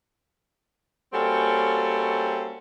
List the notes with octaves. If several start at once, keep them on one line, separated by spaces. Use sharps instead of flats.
G3 A#3 C4 C#4 F#4 A4